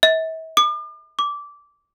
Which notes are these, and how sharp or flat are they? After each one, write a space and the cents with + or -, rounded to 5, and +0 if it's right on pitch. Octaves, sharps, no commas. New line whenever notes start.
E5 -40
D6 +45
D6 -15